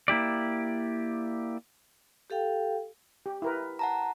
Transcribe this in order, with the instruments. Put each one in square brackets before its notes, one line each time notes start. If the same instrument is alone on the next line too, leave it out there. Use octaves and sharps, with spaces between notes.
[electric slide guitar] A#3 E4 G4 D5
[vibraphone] G4 A4 F5 G5
[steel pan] G4
E4 A#4 B4
[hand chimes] F#5 A5 A#5